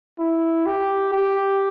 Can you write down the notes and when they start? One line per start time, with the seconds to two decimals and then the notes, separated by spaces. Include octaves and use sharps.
0.19 E4
0.66 G4
1.13 G4